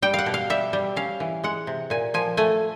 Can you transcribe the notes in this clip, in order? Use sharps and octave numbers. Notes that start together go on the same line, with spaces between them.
G3 G5
F5 F#5
B2
F5
G3 E5
G3
C#4 F5
E3
G#3 F#5
C3
A#2 G#5
F3 G#5
A3 G#5